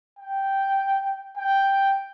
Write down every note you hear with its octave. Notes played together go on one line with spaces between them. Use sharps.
G5
G5